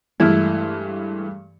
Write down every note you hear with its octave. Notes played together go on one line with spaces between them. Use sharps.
G2 E3 G#3 A3 E4 F6